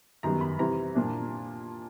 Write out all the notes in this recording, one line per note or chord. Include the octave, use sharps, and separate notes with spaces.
F#2 D#3 G3 B3 A#5
B5
C3 E3 G3 C4 A#5
A#2 F3 A#3 D4